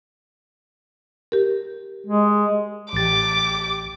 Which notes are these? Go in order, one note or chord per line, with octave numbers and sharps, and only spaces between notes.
G4 A#4
G#3
A1 G4 D6 A6